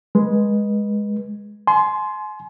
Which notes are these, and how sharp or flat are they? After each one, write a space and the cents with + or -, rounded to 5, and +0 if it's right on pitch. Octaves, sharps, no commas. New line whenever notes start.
G#3 +0 B4 -25
G#5 +40 C6 -5